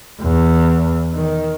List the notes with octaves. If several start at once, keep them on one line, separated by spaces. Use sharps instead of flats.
E2
D#3